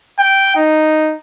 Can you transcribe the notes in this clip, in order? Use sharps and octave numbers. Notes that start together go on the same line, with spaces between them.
G5
D#4